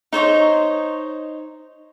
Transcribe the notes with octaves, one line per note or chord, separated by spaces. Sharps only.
D#4 C5 C#5 D#5